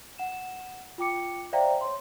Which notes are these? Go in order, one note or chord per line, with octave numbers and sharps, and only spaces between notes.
F#5 E7
F4 G5 D6 C#7
C5 D5 E5 F5 G5 A#5
C#5 C6